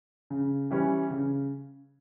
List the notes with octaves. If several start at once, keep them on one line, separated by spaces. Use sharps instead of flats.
C#3
E3 G3 C#4
C#3